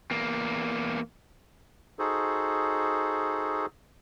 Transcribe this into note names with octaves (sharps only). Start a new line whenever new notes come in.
E2 A#3
D#4 F#4 G#4 A4 C5